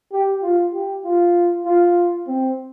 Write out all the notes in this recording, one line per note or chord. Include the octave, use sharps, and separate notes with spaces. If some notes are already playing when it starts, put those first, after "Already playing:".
G4
F4
G4
F4
F4
C4